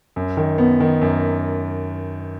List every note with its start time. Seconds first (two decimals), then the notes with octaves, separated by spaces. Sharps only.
0.16 F#2
0.37 D#3
0.58 B3
0.80 D#3
1.01 F#2